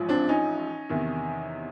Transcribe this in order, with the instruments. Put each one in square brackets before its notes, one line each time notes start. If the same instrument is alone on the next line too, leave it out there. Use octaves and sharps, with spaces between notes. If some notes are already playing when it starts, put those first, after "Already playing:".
Already playing: [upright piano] A1 G#2 F3
C4 D4
C#4 D#4
E2 C3 D#3